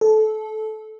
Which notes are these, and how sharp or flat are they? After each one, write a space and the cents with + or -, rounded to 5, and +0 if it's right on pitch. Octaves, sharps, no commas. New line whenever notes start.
A4 -20